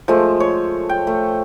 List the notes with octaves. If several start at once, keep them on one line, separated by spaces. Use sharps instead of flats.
F3 G#3 A3
C#5
G5
A3